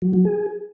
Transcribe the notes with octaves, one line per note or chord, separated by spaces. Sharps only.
F#3
F#3
G#4